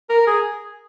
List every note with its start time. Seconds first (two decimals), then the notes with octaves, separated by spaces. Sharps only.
0.09 A#4
0.27 G#4